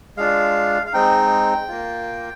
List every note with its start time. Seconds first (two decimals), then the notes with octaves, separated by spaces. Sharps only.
0.17 G#3 D4 F4 F5
0.87 F5
0.93 G#3 C4 D#4 G5
1.69 A#3 F4